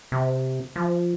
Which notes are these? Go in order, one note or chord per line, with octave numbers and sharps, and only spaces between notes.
C3
F3